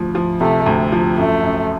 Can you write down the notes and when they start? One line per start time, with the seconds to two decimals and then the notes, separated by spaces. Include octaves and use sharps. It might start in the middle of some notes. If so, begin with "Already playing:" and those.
Already playing: D2 F3
0.15 F3
0.40 C3 A3
0.66 D2
0.92 F3
1.17 F#2 A3
1.43 F#2